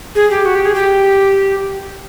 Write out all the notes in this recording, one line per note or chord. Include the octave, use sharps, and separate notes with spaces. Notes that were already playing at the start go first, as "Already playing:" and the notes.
G#4
G4
F#4
G4
G#4
G4